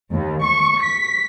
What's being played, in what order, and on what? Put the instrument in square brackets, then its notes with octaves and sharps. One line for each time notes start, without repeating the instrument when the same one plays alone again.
[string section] D#2
C#6
B6